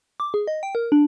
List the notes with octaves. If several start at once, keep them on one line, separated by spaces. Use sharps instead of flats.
D6
G#4
D#5
G5
A#4
D4